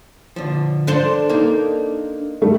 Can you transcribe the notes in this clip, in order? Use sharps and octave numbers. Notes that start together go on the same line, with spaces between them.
D3 F3
D4 A4 C5
A#3 D#4
G3 A3